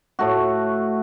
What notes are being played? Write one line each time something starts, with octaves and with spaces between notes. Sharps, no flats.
A2 A3 F#4